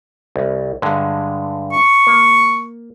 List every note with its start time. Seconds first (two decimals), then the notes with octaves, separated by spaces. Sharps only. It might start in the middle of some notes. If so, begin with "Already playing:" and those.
0.36 C2
0.82 G2 D3 G#3
1.72 C#6
2.07 A#3